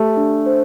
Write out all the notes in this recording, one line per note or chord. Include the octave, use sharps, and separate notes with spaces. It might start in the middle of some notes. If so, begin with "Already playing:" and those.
Already playing: A3 G4 A5
D4
C5